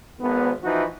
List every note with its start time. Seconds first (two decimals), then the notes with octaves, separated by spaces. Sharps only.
0.20 G#1 B3
0.63 E3 F3 D#4 E4 F#4